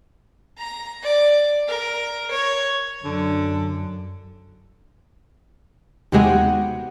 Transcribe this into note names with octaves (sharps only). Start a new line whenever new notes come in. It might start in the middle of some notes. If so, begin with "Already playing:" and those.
A#5
D5
A#4
C#5
F#2 D3
D#2 C3 G#3 B3 F#4 G4